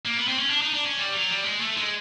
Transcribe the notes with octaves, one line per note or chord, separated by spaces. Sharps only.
A#3
B3
C4
C#4
D4
D#4
D4
C#4
G3
F#3
G3
G#3
A3
G#3